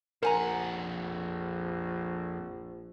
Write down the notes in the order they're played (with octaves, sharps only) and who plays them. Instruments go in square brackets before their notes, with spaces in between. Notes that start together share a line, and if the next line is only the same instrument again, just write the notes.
[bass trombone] A#1 [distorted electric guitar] F2 F#5 [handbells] A#4 [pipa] C5 G#5 A#5